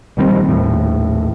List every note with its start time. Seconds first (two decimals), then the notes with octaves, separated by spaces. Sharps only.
0.17 A#1 D#3 G3 C4
0.49 A#1 D#2 A2